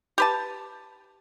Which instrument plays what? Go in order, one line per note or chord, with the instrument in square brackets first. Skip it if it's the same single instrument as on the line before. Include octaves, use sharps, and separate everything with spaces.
[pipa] G4 B4 A5